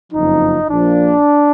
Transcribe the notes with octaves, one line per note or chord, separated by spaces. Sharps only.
F#1 F2 F3 D#4
A#1 A#2 F3 A#3 D4